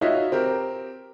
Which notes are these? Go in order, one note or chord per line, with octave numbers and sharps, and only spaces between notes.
D#4 F4 F#4 C#5 D#5 E5
C4 G4 A#4